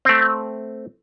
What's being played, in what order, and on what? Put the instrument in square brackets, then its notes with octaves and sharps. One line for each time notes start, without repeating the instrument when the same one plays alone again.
[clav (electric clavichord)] A3 C4